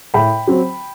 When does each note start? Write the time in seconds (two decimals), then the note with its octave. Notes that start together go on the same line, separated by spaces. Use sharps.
0.14 A2 G5 B5
0.47 F#3 C4